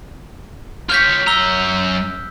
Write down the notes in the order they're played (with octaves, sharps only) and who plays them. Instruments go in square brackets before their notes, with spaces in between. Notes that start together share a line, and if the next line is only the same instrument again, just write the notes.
[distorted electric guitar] F4 C#5 [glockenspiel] F6 G6 B6
[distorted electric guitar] F#2 A#5 [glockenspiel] E6 G7